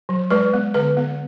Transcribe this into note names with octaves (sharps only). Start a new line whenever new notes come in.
F#3
G#3 B4
B3
D3 B4
B3